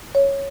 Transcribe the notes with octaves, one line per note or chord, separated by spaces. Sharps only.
C#5